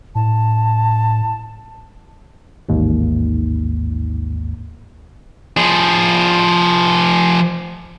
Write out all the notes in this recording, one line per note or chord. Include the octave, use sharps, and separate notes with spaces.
A2 A5
A1 D#2 G#2
F3 G#4